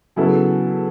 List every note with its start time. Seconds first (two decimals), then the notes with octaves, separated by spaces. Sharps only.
0.16 C#3 F#3 B3 E4 A4